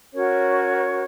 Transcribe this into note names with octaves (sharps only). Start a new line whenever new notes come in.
C#4 F#4 A#4 C#5